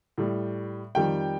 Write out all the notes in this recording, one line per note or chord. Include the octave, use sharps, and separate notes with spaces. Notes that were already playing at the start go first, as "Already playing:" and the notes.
A2 G3
F2 D#3 G3 G5